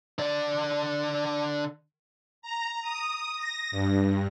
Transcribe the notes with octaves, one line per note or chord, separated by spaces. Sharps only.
D3 D5
A#5
D#6
A#6
G2